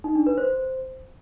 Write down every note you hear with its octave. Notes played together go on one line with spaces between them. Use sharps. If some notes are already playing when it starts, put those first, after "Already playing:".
D#4
D4
B4
C5